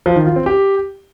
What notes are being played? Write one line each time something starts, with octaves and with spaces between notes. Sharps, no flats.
F3
D#3
F4
C4
G4